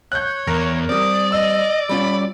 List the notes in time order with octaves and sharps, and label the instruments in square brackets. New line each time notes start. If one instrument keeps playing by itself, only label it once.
[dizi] C#5 [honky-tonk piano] F#6 G6
[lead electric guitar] E2 [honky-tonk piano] A#4
[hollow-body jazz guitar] G3 C4 [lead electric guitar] D5 [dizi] D#6
[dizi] D#5 [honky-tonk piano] E6
[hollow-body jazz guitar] G3 C#4 F4 [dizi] B5